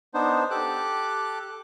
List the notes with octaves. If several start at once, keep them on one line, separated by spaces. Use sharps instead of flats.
B3 D4 D#4 C5
G4 A4 D6 F#6